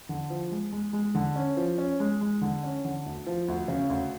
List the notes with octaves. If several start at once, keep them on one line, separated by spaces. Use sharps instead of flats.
D3
F3
G#3
G#3
G#3
D3
C#4
F3
C#4
G#3
G#3
D3
C#4
D3
D2
F3
D2
C#3
D2